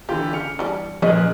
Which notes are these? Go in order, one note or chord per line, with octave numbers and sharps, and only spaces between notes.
D3 E3 F4 G4
C#3 F6 C#7 F7
E3 G3 D4
A#2 F3 G#3 C#4 G#4 B4 D#5